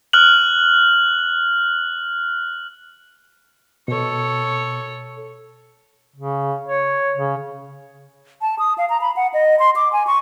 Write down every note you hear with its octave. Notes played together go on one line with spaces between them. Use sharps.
F6 F#6 F#7
B2 A4 C#5
C#3
C#5
C#3
A5
D#6
F5
A#5
B5
F#5
D#5
C6
D6
G#5
C#6